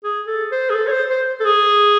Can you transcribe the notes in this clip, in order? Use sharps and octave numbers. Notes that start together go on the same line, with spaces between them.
G#4
A4
C5
G#4
A4
C#5
C5
C5
A4
G#4